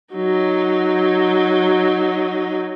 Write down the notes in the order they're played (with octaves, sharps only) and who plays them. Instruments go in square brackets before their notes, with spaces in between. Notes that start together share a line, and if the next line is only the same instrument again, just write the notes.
[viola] F#3 D#4